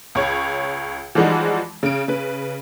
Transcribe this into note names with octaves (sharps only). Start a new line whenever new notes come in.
C#2 C#5
E3 F3 G3 G#3 D#4 F#4
C#3 D7
C#3 B4